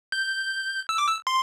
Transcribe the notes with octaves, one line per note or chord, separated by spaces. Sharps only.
G6
E6
D6
E6
C6